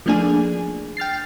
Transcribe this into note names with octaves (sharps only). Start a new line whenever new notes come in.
F3 A3 A#3 D4 G#4
G5 F6 A6 C7